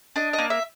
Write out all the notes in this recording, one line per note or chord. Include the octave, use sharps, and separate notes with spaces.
D4 D#5
D#5
A#3
E5